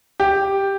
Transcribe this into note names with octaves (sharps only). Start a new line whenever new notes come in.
G4